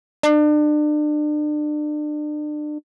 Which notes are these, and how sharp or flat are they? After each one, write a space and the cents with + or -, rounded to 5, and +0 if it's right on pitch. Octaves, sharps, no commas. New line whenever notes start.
D4 +35